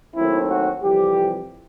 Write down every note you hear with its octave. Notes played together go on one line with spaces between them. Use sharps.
D#2 D#3 F#3 A3 C4 E4
F#4
F2 C3 E3 G3 G4